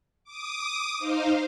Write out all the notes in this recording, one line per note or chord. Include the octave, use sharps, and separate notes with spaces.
D6 D#6
D#4 C5 F5